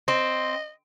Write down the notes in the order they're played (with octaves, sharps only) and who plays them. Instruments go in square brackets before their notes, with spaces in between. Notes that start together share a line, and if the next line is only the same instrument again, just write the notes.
[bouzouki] C4 [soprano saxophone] D#5